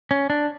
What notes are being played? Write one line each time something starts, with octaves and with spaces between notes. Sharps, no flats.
C#4
D4